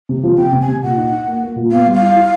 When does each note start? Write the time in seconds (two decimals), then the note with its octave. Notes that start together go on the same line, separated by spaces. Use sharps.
0.09 C3
0.23 F3
0.37 C3 G5
0.53 C3
0.61 G#5
0.68 C3
0.82 A#2 F#5
0.97 D#4
1.12 D#4
1.27 A#3
1.42 A#3
1.56 A#2
1.71 B3 F5
1.86 G3
1.93 F5
2.01 E4
2.16 E4